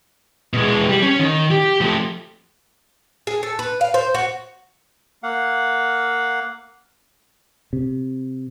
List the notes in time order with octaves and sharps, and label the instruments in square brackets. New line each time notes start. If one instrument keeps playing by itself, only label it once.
[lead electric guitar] B2 G#3
G3
C#4
D#3
G4
F3 A3
[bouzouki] G#4
A4
B4
F5
C5
F#4
[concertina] A#3 F5 F#5
[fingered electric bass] C3